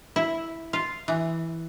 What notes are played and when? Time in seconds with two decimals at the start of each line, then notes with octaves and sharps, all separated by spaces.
0.16 E4
0.73 F4
1.08 E3